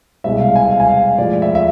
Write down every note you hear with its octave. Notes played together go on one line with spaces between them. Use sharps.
C2 B2 G#3 E5
F5
G#5
F5
G#5
F5
A2 F3 G#3 D5
E5
E5